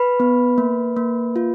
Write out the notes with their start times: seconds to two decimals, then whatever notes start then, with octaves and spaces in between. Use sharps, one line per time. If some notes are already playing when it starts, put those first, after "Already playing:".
Already playing: B4 B5
0.20 B3
0.58 A#3
0.96 A#3
1.36 F4